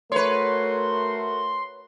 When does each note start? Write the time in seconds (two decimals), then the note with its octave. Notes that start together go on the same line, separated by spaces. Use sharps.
0.12 A3 F#4 A#4 B4 C#5 C6